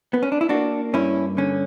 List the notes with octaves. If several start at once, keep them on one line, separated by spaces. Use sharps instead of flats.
B3
C#4
D4
E4
A#3 D4 F#4
G2 C#4 E4
D3 C#4